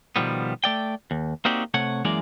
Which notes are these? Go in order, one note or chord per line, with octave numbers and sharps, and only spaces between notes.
B2 D#3 F3 G3 B3
A3 D5 G5
D#2
A#3 C4 D#4 F#4 G4 D5
C3 A3 C#5 F#5
F#2 E3 G#3 A#3 D5